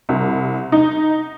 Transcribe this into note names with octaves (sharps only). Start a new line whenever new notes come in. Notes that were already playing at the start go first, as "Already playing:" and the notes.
C2
D#4